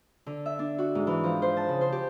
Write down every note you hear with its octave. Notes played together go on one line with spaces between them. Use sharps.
D3
E5
D4
F#4
G#2
E3
F3
C5
A5
C#3
C5
G4